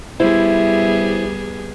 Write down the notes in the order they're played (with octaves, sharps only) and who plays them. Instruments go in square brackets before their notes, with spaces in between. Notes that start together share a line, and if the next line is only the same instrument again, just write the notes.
[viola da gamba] G3 B3 G#4 [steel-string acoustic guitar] E4 C5